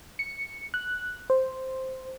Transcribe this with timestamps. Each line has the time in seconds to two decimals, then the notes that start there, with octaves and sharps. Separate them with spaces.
0.19 C#7
0.74 F#6
1.30 C5